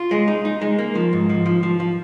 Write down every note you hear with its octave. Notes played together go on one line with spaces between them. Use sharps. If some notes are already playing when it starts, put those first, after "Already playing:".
Already playing: F4
G#3
D#4
D#4
G#3
A#3
F3
G#2
F3
F3
F3
F3